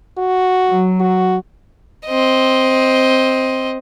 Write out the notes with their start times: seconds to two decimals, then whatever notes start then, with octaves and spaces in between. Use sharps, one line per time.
0.18 F#4
0.68 F#3
1.00 F#4
2.06 C4 D#5